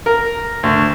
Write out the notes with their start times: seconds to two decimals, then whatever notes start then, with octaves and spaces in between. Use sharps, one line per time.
0.06 A#4
0.63 D2